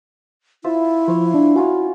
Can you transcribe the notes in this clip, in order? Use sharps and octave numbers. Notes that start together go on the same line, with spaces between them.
E4 F4 C5 E5
F3 C5 C#5
D4
C#4 F4 F#4 C#5